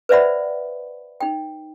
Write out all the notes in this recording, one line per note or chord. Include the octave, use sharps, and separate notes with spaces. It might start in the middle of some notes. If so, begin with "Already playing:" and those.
B4 C5 D5 E5 F#5 B5
D#4 G5